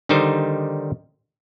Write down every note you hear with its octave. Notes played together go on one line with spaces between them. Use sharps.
D3 D#3 G3 D#4 C5